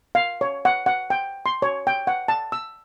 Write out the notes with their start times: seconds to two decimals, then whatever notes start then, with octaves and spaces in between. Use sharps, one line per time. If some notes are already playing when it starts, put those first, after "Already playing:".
0.15 F5
0.41 C#5
0.65 F#5
0.86 F#5
1.10 G5
1.46 C6
1.62 C#5
1.87 G5
2.07 F#5
2.28 A5
2.52 E6